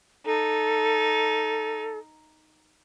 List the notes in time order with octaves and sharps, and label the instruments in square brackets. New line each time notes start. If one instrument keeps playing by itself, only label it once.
[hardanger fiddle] D#4 [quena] A4